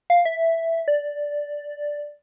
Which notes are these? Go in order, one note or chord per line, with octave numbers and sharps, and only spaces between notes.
F5
E5
D5